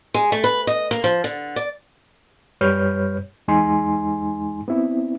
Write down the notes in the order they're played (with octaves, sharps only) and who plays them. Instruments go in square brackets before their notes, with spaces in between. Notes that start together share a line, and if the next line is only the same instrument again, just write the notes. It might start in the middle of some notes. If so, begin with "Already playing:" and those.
[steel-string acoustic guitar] G#3
A3
B4
D#5
A#3
F3
D3
D5
[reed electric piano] F#2 G3 B4 C#5 F6 G6
E2 G#3 D#4 G#5 C6
B3 C4 E4